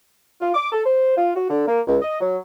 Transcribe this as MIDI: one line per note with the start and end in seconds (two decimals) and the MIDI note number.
0.41 0.51 65
0.55 0.70 86
0.72 0.83 69
0.85 1.16 72
1.17 1.32 65
1.36 1.47 66
1.50 1.64 50
1.67 1.80 58
1.87 1.97 37
2.02 2.19 75
2.21 2.38 54